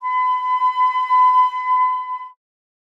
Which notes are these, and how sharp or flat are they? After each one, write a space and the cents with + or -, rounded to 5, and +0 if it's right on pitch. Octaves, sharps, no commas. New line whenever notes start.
B5 +35